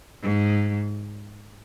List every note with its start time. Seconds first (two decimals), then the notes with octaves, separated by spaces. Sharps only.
0.22 G#2